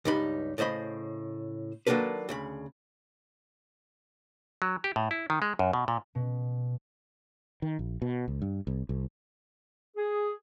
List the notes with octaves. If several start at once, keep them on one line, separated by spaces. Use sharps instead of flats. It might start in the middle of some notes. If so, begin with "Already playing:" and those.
C#2 G2 G3 D#4 B5
A2 C#3 C5 D#5 B5
D#3 F#3 A#3 D4 A4 B4
D2 C#3 B5
F#3
G4
A2
E4
D#3
G#3
F#2
B2
A#2
B2
D#3
A#1
B2
C#2
G2
C2
C2
G#4